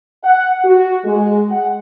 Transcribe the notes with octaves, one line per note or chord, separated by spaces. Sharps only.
F#5
F#4
G#3
F#5